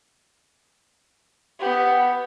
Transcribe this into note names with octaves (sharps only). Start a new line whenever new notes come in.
B3 G4